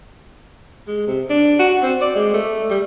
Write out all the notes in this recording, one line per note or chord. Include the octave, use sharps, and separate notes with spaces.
G#3
C3
D4
F#4
C4
D5
G#3
A3
G3